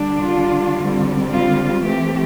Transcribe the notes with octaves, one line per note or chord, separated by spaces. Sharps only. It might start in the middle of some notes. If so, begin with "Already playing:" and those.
Already playing: D3 G3 D4
F4
D3 G3 C4
F4
E3 A3 C4 G4